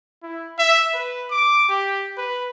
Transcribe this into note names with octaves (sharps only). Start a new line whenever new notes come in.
E4
E5
B4
D6
G4
B4